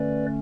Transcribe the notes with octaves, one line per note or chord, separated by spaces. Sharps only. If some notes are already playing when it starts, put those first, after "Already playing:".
Already playing: D3 A3 C#4 B4 D5